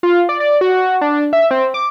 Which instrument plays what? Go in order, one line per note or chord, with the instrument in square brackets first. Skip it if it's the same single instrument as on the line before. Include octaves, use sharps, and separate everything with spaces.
[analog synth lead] F4
D5
D5
F#4
D4
E5
C4
D6